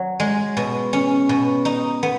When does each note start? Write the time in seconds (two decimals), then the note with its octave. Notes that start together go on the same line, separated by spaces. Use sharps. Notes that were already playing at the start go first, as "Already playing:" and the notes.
Already playing: F#3
0.20 G#3
0.57 B2
0.93 C#4
1.29 B2
1.65 D#4
2.03 B3